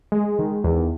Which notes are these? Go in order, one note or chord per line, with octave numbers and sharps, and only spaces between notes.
G#3
D#3
E2